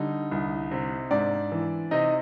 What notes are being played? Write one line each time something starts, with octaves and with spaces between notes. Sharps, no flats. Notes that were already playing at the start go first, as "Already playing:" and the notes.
Already playing: D3 G3 D#4
C2
C3
G#2 D4 D5
E3
C3 D#4 D#5